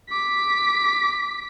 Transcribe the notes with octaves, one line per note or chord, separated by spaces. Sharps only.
D6 B6